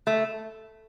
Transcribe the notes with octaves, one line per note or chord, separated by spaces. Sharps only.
A3